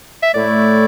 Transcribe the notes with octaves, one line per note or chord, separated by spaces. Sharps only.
E5
A2 A3 E4 D5